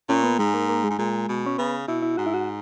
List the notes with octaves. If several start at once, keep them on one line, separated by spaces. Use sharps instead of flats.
A#2 C#4
B3
G#2 G#3
A#3
A#3
G#3
G#2
A#2 G#3
B2
C#4
C#3 B3
B2 E4
E4
G#2 F#4
E4
F#4